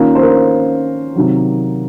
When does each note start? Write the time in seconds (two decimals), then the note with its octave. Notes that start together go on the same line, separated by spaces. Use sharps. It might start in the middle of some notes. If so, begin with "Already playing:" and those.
Already playing: D#3 A#3 C#4 F4 A#4
0.15 C5
0.22 A#4
1.16 C3 D#3 F#3